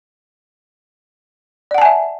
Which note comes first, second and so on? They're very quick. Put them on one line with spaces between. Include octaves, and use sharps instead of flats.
D5 F#5 A5 G#5 E5